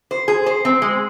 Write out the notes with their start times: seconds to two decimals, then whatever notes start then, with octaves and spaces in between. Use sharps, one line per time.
0.11 C5
0.28 G#4
0.46 C5
0.65 C4
0.82 G#3